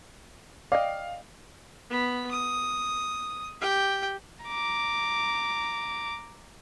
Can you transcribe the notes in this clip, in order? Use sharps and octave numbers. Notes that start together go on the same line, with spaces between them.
D5 D#5 F5 G5
B3 B5
D#6
G4 G5
A#5 D6